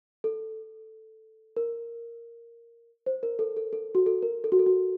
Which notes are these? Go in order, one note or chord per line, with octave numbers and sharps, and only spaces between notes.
A4
A#4
C5
A#4
A4
A4
A4
F#4
A4
A#4
A4
F#4
A4
F#4